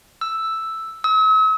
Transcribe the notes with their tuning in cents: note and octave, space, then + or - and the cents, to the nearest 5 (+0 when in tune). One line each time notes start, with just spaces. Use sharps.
E6 +0
E6 -45